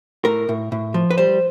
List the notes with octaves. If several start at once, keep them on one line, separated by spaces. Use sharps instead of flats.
A2 A#4
A2
A2
F3
B4
G3 C5